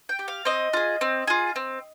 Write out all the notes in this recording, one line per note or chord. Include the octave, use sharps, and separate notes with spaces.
G5
G4
F5
C4 D#5
F4 G#4
C4
F4 G#4
C4